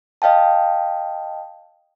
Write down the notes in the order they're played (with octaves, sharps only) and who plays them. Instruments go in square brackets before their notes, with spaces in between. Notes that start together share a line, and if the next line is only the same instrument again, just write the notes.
[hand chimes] D#5 F5 G5 A5